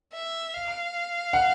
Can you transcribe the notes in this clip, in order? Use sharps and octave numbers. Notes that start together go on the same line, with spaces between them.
E5
F5
F#5